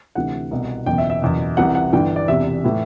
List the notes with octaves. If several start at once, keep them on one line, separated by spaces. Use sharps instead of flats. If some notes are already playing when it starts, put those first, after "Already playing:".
D2 C3 E3 F#5
C2 B2
F#1 E2 B2 G5
E5
E5
F#1 E2 B2
C2 C3 E3 F#5
F#5
G1 G2 E3 G5
D5
E1 E2 C3 E5
A2 E3